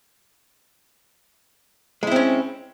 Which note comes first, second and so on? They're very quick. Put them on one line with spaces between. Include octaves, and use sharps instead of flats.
G#3 E4 C4 C#4